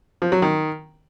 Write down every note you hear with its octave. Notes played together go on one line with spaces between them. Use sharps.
F3
F#3
D#3